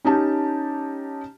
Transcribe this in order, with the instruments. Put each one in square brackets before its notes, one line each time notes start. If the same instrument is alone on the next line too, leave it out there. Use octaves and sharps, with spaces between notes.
[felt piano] C#4 D#4 G4 A5